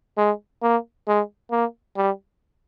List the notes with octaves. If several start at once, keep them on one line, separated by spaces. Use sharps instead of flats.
G#3
A#3
G#3
A#3
G3